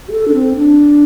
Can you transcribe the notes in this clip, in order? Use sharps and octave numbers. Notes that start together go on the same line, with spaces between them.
G4
A4
D4
C4
D4